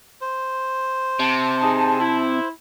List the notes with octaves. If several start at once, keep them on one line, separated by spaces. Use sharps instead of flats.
C5
C3 A5
D#4 G#4
E4